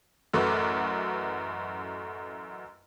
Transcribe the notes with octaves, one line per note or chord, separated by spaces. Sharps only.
A1 F#2 A3 F#4 B4 D6